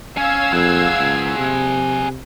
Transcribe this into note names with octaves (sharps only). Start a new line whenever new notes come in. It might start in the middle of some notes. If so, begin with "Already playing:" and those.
C#4 F5 E6 G#6
F2 G#4 F#5
C#2
C3